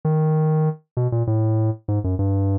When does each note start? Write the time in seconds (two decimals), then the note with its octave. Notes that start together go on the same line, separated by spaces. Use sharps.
0.05 D#3
0.97 B2
1.12 A#2
1.27 A2
1.88 G#2
2.04 F#2
2.19 G2